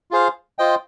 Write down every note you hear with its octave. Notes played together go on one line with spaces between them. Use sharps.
F4 G#4 C5 F5
F4 C5 D#5 G5